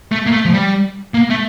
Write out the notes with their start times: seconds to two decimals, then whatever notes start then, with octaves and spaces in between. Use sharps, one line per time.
0.12 A3
0.26 A#3
0.32 A3
0.45 F3
0.53 G3
1.14 A#3
1.30 A3